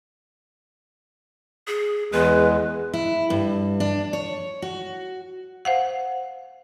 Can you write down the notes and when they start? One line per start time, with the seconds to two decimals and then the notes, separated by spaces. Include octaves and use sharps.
1.67 G#4
2.12 E2 G#3 B4
2.93 E4
3.30 G2
3.80 D4
4.13 C#5
4.62 F#4
5.65 C5 F5 F#5